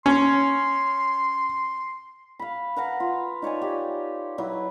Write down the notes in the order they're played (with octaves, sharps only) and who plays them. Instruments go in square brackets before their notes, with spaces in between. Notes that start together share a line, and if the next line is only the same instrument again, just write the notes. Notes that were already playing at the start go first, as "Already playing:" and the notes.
[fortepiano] C#4 [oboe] C6
[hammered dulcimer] F5 B5
B4 F5 F#5 A#5
F4
D#4 C#5 D5 G#5
G4
F#3 E4 B4